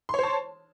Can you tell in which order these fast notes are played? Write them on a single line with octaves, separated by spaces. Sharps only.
C6 C#5 C5 A5